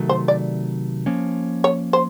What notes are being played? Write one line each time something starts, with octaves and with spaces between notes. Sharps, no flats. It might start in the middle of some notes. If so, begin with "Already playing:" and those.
Already playing: C3 D#3 F#3 A3
C5
D5
F3 A#3 C#4
C#5
C5